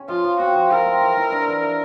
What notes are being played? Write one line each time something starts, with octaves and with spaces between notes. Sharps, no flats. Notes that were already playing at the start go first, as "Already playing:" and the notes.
Already playing: C#4
F3 F4
F3
C4 F#4
F3
E4 A#4
C4
E3
E4
D4
E3
E3